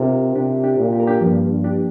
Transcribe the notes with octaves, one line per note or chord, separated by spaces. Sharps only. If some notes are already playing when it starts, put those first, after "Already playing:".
Already playing: C3 D4 F4 G4 A#4
C3 D4 G4
D4 G4
A#2
G4
A#4
D4 G4
G2 F3 A#3
G2
D4 G4